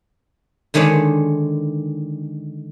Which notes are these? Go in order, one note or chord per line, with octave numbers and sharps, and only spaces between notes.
D3 D#3 G#3 C#4 D4